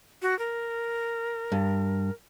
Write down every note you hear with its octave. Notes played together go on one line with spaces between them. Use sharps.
F#4
A#4
G2